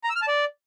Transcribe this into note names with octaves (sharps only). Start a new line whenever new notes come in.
A#5
E6
F6
A5
D5